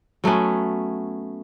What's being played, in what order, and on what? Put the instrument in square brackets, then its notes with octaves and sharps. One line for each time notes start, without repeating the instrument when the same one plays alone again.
[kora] F#3 A3 B3 C#4